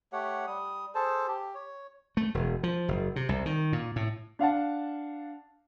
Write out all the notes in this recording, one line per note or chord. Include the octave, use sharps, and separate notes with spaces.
A3 G4 C#5 F#5
G3 D#6
G#4 A4 C5 A5
G4
C#5
A3
E1
F3
F#1
C3
C2
D#3
A#2
A2
D4 F5 F#5 A5